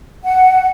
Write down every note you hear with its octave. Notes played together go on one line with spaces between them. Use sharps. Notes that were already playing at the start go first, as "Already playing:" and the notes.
F#5